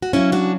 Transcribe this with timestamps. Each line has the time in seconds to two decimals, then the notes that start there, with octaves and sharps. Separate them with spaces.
0.02 F#4
0.13 C#3 F#3 C#4 E4
0.32 D4 F#4